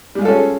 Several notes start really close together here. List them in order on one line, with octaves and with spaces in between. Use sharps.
G3 G#3 F4 A4 C#4